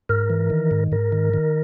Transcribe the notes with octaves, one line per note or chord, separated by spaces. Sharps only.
G#2 A#4
E3
D#3
G#2
G#2 A#4
D#3
D#3